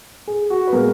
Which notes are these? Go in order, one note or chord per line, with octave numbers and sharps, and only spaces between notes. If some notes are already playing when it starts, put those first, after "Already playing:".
G#4
F#4
B4
A#2 G#3 B3 A#4